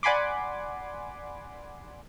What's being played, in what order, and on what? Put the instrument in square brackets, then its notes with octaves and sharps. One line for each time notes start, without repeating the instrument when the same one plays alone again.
[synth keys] D5 F#5 G#5 B5 C6 D6